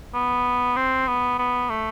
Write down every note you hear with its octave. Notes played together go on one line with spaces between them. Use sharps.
B3
C4
B3
B3
A3